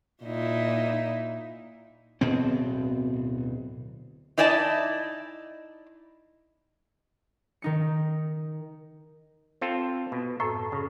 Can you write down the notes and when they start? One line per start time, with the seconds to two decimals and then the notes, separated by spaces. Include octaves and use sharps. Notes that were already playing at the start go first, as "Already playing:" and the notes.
0.24 A#2 D#4 E4
2.21 D1 B2 B3 C4
4.38 D#4 E4 D5 D#5 G#5 A5
7.62 D#3 D#4 C#7
9.61 C4 F4 A4
10.12 B2
10.40 F#2 A2 A4
10.72 C#3